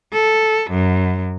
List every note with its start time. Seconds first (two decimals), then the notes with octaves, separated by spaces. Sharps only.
0.13 A4
0.70 F#2